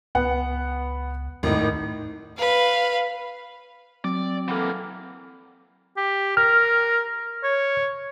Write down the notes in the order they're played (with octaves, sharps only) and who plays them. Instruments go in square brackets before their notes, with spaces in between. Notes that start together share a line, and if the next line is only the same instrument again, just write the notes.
[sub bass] C#2 [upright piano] B3 F#5
[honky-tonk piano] G#1 A2 D#4 [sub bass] E2
[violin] B4 F5
[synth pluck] F#3 [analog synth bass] C4 [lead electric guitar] D5
[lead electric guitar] E3 A#3 [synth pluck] A4 B4 F#5
[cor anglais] G4
[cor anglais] A#4 [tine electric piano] F6
[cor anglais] C#5